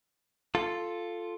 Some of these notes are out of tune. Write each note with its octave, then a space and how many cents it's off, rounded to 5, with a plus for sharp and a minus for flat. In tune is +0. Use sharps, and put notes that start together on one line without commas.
F4 +0 A4 +0